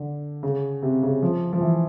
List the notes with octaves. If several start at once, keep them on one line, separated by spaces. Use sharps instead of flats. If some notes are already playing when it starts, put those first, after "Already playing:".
Already playing: D3
C#3
C3
C#3
F3
F3
E3